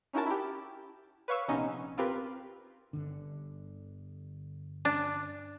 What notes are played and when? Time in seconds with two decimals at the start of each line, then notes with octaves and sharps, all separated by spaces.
0.13 C#4 D#4 E4 F#4 A#4 A5
0.26 E4 G4
1.28 B4 C#5 F5 C#6 E6
1.48 A#1 C3 B3 C#4 D#4 D#5
1.98 C4 F4 G4 A#4 B4
2.93 G1 D3
4.85 D4